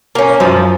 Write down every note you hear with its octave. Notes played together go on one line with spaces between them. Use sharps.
A#3 C#4
F#2 F3